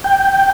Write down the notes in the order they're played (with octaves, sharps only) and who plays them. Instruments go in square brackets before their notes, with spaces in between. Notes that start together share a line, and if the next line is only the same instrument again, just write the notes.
[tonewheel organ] G5